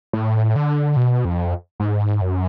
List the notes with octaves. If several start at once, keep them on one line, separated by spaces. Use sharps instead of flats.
A2
D3
B2
F2
G#2
F#2